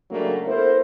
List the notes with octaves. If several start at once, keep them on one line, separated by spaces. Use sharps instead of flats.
C#3 F#3 G3 A3 A#3 D4
B3 E4 A4 A#4 C5